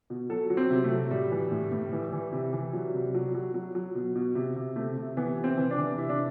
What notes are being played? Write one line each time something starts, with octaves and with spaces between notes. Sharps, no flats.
B2
F#3 A4
F#3
C4
C3
A3
F#3
A2 G3
E3
A2
A2
E3
E3
C3
E3
F#3
C3
F#3
F#3
F#3
F#3
B2
B2
C3
C3
C3 A3
C3
E3 B3
C3
C4
E3
D4
E3
C3 E4
D4